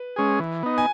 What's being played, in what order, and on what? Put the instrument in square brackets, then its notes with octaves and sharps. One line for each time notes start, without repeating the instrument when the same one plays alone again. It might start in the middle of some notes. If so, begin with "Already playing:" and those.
Already playing: [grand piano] B4
[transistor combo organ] G#3 C#4 G#4
E3
B3 D#4
[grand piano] G#5